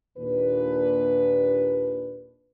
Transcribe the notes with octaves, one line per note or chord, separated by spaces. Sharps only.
D#2 A#2 D4 B4